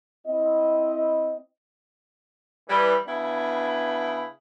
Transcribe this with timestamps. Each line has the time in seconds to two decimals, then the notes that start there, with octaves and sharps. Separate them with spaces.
0.27 C4 E4 D#5
2.68 E3 G3
3.06 C#3 B3 D4 E4